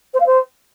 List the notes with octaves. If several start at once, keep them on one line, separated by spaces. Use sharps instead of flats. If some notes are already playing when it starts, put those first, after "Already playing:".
C5
F5
C5